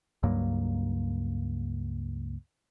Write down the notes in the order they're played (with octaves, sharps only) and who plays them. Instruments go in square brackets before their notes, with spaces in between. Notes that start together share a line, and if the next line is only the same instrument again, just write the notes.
[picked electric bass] C#2 G2 F#3 A#3